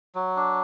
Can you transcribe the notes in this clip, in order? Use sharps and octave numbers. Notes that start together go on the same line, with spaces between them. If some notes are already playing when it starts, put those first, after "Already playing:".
F#3
D4